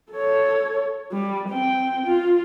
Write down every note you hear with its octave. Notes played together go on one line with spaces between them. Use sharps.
A4 C#5
G3
C4 G5
F4